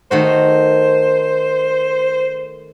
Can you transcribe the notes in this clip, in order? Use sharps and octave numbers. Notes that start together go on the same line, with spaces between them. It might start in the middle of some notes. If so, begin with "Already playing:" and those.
D#3 A3 F#4 C5